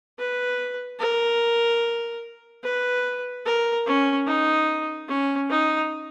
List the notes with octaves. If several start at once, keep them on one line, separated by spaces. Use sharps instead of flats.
B4
A#4
B4
A#4
C#4
D#4
C#4
D#4